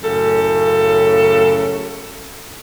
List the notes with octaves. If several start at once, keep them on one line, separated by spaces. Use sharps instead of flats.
F#2 A2 C#3 A4